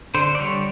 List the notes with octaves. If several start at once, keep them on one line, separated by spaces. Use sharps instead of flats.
D3 C5
D5
G3 C#5